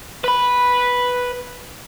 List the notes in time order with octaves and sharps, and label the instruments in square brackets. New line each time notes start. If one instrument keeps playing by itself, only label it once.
[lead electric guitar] B4 B5